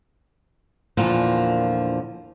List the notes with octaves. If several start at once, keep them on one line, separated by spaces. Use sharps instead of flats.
E2 A#2 D3 F3 A#3